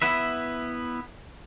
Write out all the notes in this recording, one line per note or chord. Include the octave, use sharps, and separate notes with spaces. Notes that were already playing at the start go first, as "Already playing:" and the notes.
B3 E4 B4 E5